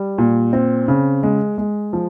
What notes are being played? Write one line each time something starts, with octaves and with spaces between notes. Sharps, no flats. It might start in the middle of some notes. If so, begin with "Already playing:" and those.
Already playing: G3
A#2
C4
C#3
G#3
G#3
F3